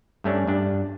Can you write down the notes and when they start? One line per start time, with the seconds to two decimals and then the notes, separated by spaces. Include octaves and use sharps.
0.24 G2 A3 C#4 D4
0.47 G2 D4